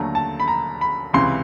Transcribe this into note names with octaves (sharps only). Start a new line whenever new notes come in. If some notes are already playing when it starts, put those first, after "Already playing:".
Already playing: D#2 D3 F#3 A3 A#5
A5
B5
A#5
B5
C#2 C3 E3 C6